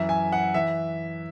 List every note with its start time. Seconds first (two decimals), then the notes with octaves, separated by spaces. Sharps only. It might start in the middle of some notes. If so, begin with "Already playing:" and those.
Already playing: F#2 E3 E5
0.09 G#5
0.32 F#5
0.54 E3 E5